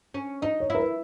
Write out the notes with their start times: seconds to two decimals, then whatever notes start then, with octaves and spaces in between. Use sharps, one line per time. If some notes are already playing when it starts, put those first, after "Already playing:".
0.14 C#4
0.42 D#4 D#5
0.60 C#5
0.70 E4 A#4
0.80 B4